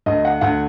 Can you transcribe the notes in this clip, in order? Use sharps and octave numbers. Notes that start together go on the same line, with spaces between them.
D2 D#5
F#5
D2 F#5